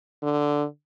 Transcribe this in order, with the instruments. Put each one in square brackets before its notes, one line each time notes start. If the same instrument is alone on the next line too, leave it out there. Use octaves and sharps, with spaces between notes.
[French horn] D3